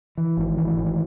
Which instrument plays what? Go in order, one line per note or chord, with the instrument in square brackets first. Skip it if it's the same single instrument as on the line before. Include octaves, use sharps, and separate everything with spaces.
[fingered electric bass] E3
G#1
E3
G#1